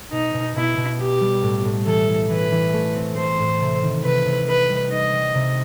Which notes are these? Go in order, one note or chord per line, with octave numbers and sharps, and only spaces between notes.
B2 D#4
B2
B2 E4
B2
B3 G4
G3
A2
A2
E3 A4
E3
E3 B4
E3
A3
C4
A3 C5
A2
C3
D#3
C3 B4
C3
D#4 B4
G3
D#4 D#5
G3
C3